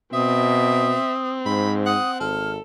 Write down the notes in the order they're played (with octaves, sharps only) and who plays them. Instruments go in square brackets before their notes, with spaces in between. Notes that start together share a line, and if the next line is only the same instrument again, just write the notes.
[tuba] B2 [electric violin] C4 [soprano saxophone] E5 [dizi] D#6
[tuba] G#2 [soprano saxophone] B5
[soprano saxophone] F#5 [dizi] D#6
[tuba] G#1 [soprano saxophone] A4 [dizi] F6